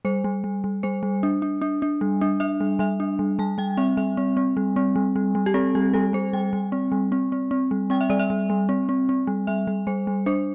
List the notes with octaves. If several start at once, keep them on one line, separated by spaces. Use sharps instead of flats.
G3 C5
G3
G3
G3
G3 C5
G3
D4
D4
D4
D4
G3
D4
D4 E5
G3
G3 E5
D4
G3
G3 A5
G3 G5
C4 E5
G3 E5
C4
C4
G3
C4
G3
G3
G3
G4
C4 A4
G3 G4
G3 A4
G3 C5
G3 G5
G3
C4
G3
C4
C4
C4
G3
C4 G5
E5
G3 D5
E5
G3
G3
C4
C4
C4
G3
G3 E5
G3
G3 C5
G3
D4 C5